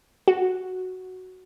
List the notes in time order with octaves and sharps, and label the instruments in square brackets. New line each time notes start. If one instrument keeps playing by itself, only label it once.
[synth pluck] F#4